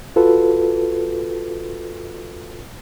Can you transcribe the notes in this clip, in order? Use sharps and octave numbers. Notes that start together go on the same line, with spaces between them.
F4 F#4 A4 B4